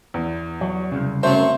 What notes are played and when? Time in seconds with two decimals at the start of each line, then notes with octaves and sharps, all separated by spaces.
0.14 E2
0.61 F#3
0.92 C2 C#3
1.23 F#2 A3 C4 C5